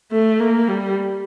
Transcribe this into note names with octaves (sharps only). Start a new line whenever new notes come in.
A3
A#3
G3